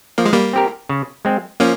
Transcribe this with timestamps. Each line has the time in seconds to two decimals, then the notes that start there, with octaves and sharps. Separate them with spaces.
0.18 F3 A#3
0.26 G#3
0.33 G3 A#3
0.53 C4 G4 A#4
0.89 C#3
1.25 G#3 C4
1.60 F3 A#3 C#4